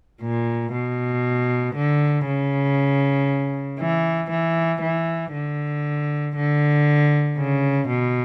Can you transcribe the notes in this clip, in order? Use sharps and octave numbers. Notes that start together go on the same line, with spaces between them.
A#2
B2
D3
C#3
E3
E3
E3
D3
D3
C#3
B2